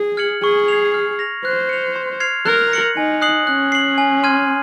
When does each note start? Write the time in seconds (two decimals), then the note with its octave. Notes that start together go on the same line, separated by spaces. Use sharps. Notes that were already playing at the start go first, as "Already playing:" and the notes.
Already playing: G#4
0.17 F6 G#6 C#7 F#7
0.43 G#4 C#6
0.68 G#6 C7 F7
0.94 F6
1.19 A#6 F7
1.45 C5 F#6
1.69 C#7 F7
1.96 C6
2.20 F6 G#6 C7 F7
2.46 A#4 F#6
2.71 A#6 C#7 F#7
2.97 D#4 G#5
3.22 D#6 F#6 C7 F#7
3.47 C#4 F#6
3.72 C7 F#7
3.98 G#5
4.23 C6 F6 G#6 D#7